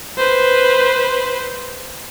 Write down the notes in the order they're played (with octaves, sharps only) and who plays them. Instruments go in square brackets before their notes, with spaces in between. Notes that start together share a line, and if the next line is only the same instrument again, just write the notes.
[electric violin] B4 C5